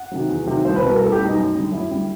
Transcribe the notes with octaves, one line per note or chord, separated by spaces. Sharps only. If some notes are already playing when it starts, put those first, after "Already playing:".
Already playing: F#5
C3 D#3 F#3
E2
C3 D#3 F#3
C2 C5
B4
B2 G3
A#4
C2 A4
G4
B2 G3
D#4
F#2
D3 G3
F#2 E4
D3 G3